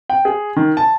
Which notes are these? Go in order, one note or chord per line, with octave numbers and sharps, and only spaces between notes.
G5
G#4
D#3
A5